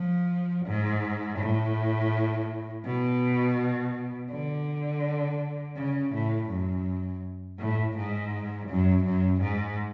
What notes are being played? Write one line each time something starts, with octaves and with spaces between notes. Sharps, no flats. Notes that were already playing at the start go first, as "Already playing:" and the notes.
Already playing: F3
G#2
A2
B2
D3
C#3
A2
F#2
A2
G#2
F#2
F#2
G#2